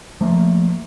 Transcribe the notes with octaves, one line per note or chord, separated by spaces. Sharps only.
F3 A3 A#3